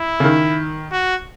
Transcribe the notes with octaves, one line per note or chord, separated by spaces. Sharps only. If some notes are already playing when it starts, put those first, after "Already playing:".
Already playing: E4
C#3
D#3
F#4